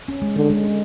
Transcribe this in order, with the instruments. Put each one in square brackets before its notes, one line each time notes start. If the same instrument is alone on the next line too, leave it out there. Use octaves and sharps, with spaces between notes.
[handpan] C#4
G#3
[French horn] D3 [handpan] G#3
[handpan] G#3
C#4